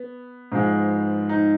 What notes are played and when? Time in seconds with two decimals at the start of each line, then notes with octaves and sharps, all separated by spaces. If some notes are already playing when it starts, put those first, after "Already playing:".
Already playing: B3
0.52 G#2 F3 G#3
1.29 D#4